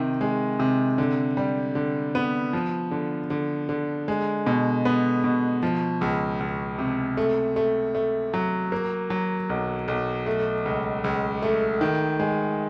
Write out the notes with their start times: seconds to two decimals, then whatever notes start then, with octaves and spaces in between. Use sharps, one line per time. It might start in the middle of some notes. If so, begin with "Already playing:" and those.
Already playing: C3 D#3
0.21 G#3
0.59 C3
0.98 D3
1.37 G3
1.75 D3
2.15 B3
2.53 F3
2.91 D3
3.30 D3
3.69 D3
4.08 G#3
4.47 B2
4.85 B3
5.24 B2
5.63 F3
6.01 C#2
6.40 C#2
6.78 C3
7.17 A3
7.56 A3
7.95 A3
8.34 F#3
8.72 A#3
9.10 F#3
9.50 B1
9.88 B1
10.26 A3
10.65 C#2
11.04 C#2
11.42 A3
11.81 D#3
12.20 G#3